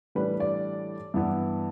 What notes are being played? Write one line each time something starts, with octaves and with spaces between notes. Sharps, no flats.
A2 E3 G3 D4 B4
D5
G2 E3 B3 E4